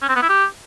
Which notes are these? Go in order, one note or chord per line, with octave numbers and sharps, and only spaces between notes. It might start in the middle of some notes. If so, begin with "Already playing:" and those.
C#4
C4
B3
E4
G4